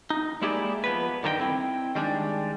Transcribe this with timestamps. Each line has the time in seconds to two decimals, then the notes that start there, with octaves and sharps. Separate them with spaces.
0.10 D#4
0.42 G#3 A#3 E4 G4 G#4 D5
0.84 F3 B3 B4
1.23 G2 D3 D#3 A#4 D#5 G5
1.40 C4 E4
1.95 D#3 G3 G#3 D4